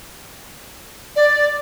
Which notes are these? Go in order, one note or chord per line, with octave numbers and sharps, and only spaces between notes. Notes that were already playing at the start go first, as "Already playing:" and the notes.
D5